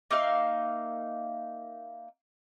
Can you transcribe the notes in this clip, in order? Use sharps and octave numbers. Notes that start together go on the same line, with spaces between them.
A#3 D#4 E5 F5